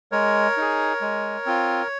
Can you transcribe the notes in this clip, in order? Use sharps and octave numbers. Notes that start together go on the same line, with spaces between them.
G#3 A#4 C#5
D#4 G#4
G#3
C4 F4